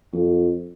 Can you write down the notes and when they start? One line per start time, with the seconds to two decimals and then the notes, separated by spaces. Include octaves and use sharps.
0.13 F2